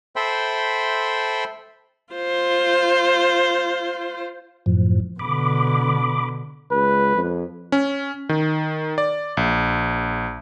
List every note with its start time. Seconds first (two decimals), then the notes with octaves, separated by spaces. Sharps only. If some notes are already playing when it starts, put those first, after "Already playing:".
0.16 A4 C5 E5 G5 B5 C6
2.14 F4 C5
4.66 F#2 A2 F3
5.19 B2 D3 B5 D6
6.71 C#2 B4
7.15 F2
7.72 C#4
8.29 D#3
8.98 D5
9.37 A#1